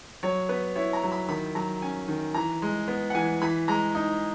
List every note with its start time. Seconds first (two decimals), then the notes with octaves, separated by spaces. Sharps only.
0.23 F#3 C#5
0.49 B3 B4
0.75 E4 C#5
0.93 A#5
1.03 F#3
1.12 B5
1.29 D#3 B5
1.55 F#3 A#5
1.82 C#4 G#5
2.08 D#3
2.34 E3 A#5
2.62 G#3
2.88 B3
3.10 F#5
3.14 E3 G#5
3.42 E3 B5
3.68 G#3 A#5
3.95 D#4